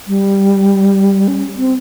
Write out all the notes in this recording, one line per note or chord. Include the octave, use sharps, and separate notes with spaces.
G3
C#4
C4